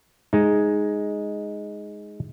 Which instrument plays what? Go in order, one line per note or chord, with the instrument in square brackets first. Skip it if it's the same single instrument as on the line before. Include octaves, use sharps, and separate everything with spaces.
[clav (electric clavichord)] G#3 D#4